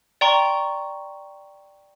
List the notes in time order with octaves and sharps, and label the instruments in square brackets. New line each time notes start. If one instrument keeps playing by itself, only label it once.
[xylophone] D5 G5 A#5 C6 C#6